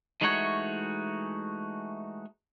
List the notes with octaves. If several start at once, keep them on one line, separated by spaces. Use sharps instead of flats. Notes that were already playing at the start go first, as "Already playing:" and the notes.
E3 G#3 A3 D#4 F#4 C#5